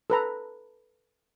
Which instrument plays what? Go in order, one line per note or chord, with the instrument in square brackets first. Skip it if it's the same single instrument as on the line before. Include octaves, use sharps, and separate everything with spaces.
[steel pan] A4 B4 A#5